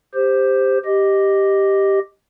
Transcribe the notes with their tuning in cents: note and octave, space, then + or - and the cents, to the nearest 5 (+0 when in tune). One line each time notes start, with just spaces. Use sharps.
G4 +15 C5 +0
G4 +0 D#5 +0